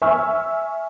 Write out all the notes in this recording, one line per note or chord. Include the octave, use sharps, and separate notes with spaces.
E5 G#5 C#6 E6 F6